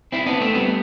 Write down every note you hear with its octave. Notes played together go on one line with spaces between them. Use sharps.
C4 E4
B3 D4
A3 C4
G3 B3